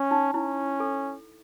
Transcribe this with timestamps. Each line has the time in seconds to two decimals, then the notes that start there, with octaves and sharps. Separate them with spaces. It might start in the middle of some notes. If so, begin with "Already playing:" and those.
Already playing: C#4
0.11 D#4
0.33 C#4 E4
0.80 A4